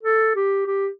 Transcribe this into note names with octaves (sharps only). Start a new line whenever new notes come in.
A4
G4
G4